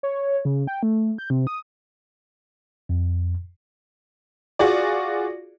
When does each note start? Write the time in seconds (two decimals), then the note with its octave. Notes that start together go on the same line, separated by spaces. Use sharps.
0.03 C#5
0.45 C#3
0.67 G5
0.83 A3
1.18 G6
1.30 C3
1.47 D#6
2.89 F2
4.59 F4 F#4 G#4 D5